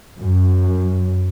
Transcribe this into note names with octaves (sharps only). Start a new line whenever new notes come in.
F#2